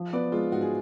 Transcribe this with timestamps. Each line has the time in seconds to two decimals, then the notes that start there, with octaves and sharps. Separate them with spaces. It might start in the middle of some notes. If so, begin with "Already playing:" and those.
Already playing: F3
0.13 B3 B4 D5
0.32 G#3 F4
0.52 G#2 F#4
0.61 G#4